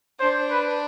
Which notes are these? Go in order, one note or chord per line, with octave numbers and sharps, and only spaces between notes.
D4 C5
B4